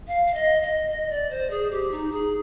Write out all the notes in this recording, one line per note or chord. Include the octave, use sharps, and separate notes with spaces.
F5
F5
D#5
D#5
D#5
D5
C5
G#4
G4
D#4
G#4